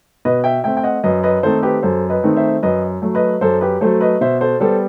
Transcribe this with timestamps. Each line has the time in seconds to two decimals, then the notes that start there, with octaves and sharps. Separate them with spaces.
0.25 B2 B4 D#5
0.44 E5 G5
0.64 A3 C4 E5 G5
0.77 G5
0.83 D#5 F#5
1.04 F#2 B4 D#5
1.23 B4 D#5
1.43 D#3 A3 C4 D#4 A4 C5
1.63 G4 B4
1.83 F#2 A4 C5
2.09 B4 D#5
2.23 D#3 A3 C4 D#4
2.36 C5 E5
2.63 F#2 B4 D#5
3.02 F#3 A3
3.15 B4 D#5
3.41 F#2 A4 C5
3.61 G4 B4
3.81 F#3 A3 A4 C5
4.01 B4 D#5
4.21 B2 C5 E5
4.41 A4 C5
4.60 G3 B3 A4 C5